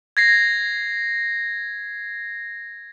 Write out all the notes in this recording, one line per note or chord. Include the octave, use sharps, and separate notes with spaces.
G#6 A#6 C7